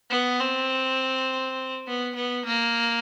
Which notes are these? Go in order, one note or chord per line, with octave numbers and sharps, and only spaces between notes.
B3
C4
B3
B3
A#3